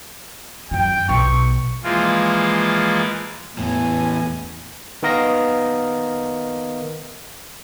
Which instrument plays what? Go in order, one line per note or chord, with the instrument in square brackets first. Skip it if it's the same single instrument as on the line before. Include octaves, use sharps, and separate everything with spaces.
[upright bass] F#2 D#3 [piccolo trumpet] G5
[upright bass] B1 B3 [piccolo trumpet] C#6
[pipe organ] E3 F3 G#3 A#3 F4
[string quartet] E2 G#5 [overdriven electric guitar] A2 E3
[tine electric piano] D#3 B3 A#4 D#5 F5 A#6